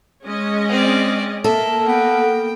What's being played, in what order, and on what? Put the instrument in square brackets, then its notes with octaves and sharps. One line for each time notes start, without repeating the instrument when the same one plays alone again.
[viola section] G#3 C#4 D#5
[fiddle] C4 D5
[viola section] A#3 [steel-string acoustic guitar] A4 [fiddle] E5
[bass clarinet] B3 [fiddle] G5